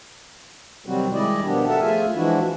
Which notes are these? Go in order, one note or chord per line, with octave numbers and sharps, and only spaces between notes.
C3 D#3 F#3 G3 C4 F#4
D#3 G3 G#3 E4 D5 D#5
B2 D#3 F3 B3 D4 G4
G4 A4 A#4 E5 F#5 A5
F3 A3 F4 G#4 E5 G#5
E3 F3 G#3 D4 E4 F#4